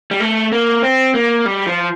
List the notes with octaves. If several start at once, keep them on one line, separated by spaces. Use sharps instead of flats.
G3
A3
A#3
C4
A#3
G3
F3